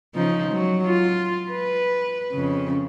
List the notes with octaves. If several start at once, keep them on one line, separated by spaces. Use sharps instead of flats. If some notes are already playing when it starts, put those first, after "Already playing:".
C#3 F3 D#4
F#3
F4
B4
F2 C#3